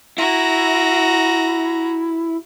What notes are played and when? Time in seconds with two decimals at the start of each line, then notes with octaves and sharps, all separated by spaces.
0.18 E4 F#4 A#5